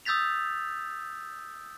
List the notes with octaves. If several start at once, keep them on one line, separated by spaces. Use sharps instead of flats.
D#6 E6 G6 A6 B6 F7